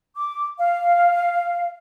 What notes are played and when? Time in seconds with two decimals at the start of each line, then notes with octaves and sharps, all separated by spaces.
0.16 D6
0.59 F5